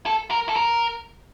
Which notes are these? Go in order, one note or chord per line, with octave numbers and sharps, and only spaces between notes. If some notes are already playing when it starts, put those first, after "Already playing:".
A4
A#4
A4
A#4